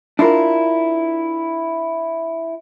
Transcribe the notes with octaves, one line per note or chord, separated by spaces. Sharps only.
D4 E4 F4 A#4